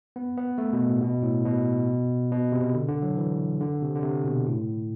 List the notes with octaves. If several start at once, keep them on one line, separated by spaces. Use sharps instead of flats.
B3
B3
A3
B2
A2
B2
A2
B2
B2
C3
D3
D3
F#3
E3
D3
C3
D3
C3
B2
A2